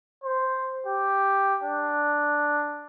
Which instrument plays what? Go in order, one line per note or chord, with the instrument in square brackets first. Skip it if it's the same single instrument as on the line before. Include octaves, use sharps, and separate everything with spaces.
[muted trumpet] C5
G4
D4